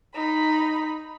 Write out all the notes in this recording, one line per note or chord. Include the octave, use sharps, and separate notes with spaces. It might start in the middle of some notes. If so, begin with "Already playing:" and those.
D#4 B5